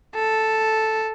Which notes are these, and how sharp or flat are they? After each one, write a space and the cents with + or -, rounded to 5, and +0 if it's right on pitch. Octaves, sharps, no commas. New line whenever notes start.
A4 +0